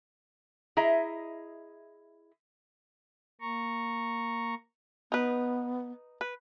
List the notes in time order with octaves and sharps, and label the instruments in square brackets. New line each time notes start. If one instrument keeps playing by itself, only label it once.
[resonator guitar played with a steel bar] E4 G#4 D#5 E5 A#5
[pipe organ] A#3 A#5 C#6
[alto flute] B3 [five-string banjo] D#4 B4
[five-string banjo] B4